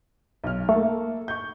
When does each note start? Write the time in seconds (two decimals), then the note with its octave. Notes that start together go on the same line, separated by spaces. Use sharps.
0.44 B1 F6
0.69 A3 A#3 A4
1.28 C#6 G6